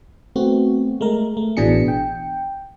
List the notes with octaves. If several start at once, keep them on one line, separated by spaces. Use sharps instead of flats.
A3 B3 C4 F#4
G#3 A3 A#4
A3
A1 B2 E3 D4 G#4 C#7
G5